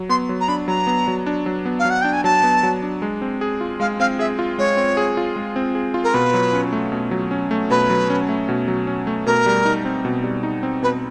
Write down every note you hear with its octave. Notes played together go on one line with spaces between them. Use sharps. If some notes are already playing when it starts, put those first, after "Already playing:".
Already playing: F#3
B3 C6
F#3
A#5
D4 B5
F#3 A#5
B3
F#3
D4
F#3
B3
F5
F#3
F#5
D4 G5
G#5
F#3 A5
B3
F#3
D4
G#3
C4
G#4
F4
G#3 F5
C4 F5
G#4 E5
F4
G#3 C#5
C4
G#4
F4
G#3
C4
G#4
F4
A#4
B2 B4
F#3
C#4
A3
B2
F#3
C#4
A3
B2 B4
F#3
C#4
A3
B2
F#3
C#4
A3
B2 A#4
G3
D#4
C4
B2
G3
D#4
C4
B2 B4